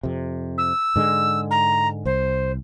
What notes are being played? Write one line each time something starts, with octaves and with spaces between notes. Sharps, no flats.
F2 C3
E6
G#2 D3 G#3
A#5
C2 C5